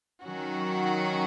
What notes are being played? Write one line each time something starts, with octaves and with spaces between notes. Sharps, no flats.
D#3 F#3 C#4 F#4